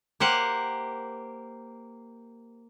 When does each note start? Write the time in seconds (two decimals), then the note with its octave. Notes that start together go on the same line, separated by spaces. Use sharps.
0.20 A#3 G4 C5 F#5